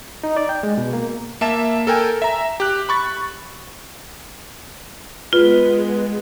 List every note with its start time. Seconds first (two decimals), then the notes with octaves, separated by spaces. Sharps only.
0.23 D#4
0.37 D5
0.49 G5
0.63 G#3
0.78 B2
0.93 A#3
1.41 A#3 E5 A5 E7
1.87 A4 A#4 G5 G#5
2.22 E5 A#5
2.60 G4 F#6
2.89 B5 C#6 A6
5.33 G#3 B3 F4 B4